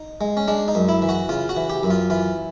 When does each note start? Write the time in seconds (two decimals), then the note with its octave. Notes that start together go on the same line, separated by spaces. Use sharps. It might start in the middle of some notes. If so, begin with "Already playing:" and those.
Already playing: D#4
0.21 G#3
0.37 C#4
0.48 G#3 D4
0.68 D#4
0.75 F#2
0.89 E4
1.02 E3
1.09 F#4
1.29 C#3 F4
1.49 F#4
1.57 E3
1.70 G4
1.83 F#2
1.90 F4
2.10 E3 F4